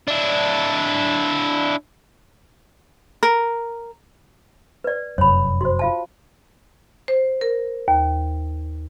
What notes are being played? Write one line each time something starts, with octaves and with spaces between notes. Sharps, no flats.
D4 E4
A#4
B4 D5
F1 F#2 C#5 B5
F#4 C5
F4 F5 A5
C5
A#4
D#2